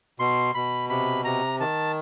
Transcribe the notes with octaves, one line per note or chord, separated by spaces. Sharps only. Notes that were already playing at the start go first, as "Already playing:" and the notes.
B2 C6
B2 B5
C3 B5
C3 A#5
D#3 A5